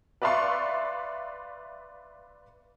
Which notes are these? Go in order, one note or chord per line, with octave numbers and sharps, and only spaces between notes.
B4 D5 E5 F5 C6 C#6